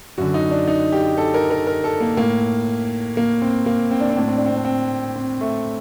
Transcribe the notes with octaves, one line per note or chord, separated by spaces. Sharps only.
F#2 D3 F#4
D#4
D4
D#4
G4
A4
A#4
A#4
A#4
A4
A#3
A2 A#3
A#3
C4
A#3
C4
D4
C4
A2 D4
C4
D4
C4
D4
C4
C4
A3